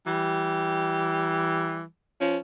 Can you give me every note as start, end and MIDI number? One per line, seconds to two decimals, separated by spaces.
0.07 1.83 52
0.07 1.87 55
2.21 2.37 53
2.21 2.37 61